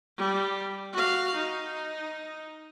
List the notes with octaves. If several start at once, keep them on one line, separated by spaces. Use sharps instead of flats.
G3
F#4 F5
D#4